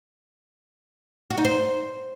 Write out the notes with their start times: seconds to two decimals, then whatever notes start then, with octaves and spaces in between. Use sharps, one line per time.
1.30 F#4
1.38 D#4
1.45 C5